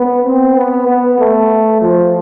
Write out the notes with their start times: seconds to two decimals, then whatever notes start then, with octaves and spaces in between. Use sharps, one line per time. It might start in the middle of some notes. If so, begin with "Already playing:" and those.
Already playing: B3
0.25 C4
0.56 B3
0.87 B3
1.19 A3
1.81 F3